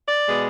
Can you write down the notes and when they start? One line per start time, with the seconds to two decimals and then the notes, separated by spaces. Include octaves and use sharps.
0.09 D5
0.27 B2 G#3 B3